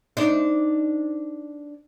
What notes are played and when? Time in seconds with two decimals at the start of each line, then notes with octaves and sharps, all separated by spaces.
0.17 D4 D#4 C5